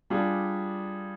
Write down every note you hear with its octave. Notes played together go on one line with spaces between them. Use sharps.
G3 D4 F4 G#4